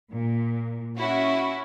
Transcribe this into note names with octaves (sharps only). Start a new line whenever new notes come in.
A#2
C#4 E4 F#4